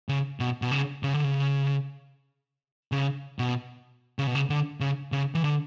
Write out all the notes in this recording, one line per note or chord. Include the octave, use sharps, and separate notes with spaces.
C#3
B2
B2
C#3
C#3
D3
C#3
C#3
B2
C#3
B2
C#3
D3
C#3
C#3
E3
D3